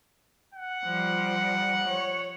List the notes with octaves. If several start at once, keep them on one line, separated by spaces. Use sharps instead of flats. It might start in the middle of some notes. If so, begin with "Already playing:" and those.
F#5
F3 G3
C#5